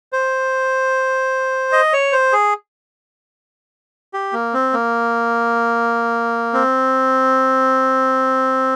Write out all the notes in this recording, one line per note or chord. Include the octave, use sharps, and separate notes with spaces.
C5
D#5
C#5
C5
G#4
G4
A#3
C4
A#3
C4